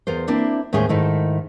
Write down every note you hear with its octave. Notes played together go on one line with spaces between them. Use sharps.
E2 F4 A#4 C5
A#3 C4 D4 E4
D#2 A2 G#3 C#4 G#4 C5
G#2 D#3 A3 E4